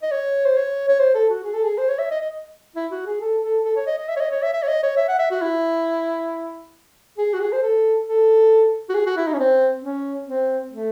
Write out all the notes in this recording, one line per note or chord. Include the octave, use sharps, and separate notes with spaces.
D#5
C#5
C5
C#5
C#5
C5
A4
F#4
G#4
A4
G#4
C5
C#5
E5
D#5
D#5
E4
F#4
G#4
A4
A4
A4
C#5
D#5
D#5
E5
C#5
D#5
C#5
E5
E5
C#5
D#5
C#5
E5
F#5
E5
F#4
E4
G#4
F#4
G#4
C5
A4
A4
F#4
G#4
F#4
E4
D#4
C#4
C4
C#4
C4
A3